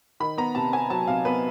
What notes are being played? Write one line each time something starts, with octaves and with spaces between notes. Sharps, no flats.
D#3 B5
B3 A#5
C3 A5
B3 G#5
F#3 A5
C3 F5
B3 B4